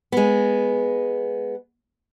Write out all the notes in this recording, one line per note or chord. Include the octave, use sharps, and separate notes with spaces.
G#3 B3